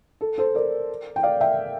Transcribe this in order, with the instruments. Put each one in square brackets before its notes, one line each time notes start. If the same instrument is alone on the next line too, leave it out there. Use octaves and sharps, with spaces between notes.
[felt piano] A4
A4 C5
A#4 D5
G5
D5 F5
E5 G5